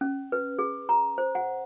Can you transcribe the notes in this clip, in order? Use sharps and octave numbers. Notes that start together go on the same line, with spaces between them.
C#4
B4
G#4
A#5
C5
F#5